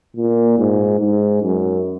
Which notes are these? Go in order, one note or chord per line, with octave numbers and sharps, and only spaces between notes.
A#2
G#2
G#2
F#2